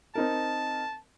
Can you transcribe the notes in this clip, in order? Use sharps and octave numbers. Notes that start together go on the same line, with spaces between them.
C4 D#4 A#4 A5